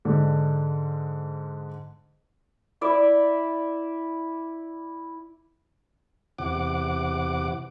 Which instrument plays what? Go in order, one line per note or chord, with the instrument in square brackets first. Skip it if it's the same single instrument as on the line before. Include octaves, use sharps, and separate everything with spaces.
[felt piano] G#2 D3
[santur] E4 D5 E5
[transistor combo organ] E2 C3 F#5 D6